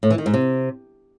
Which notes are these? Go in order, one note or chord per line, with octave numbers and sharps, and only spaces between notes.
A2
E3
D#3
G#2
C3